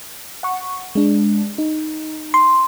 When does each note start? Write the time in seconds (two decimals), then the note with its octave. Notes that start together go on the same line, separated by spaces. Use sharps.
0.43 F#5 C#6
0.95 G#3 D4
1.58 D#4
2.34 C6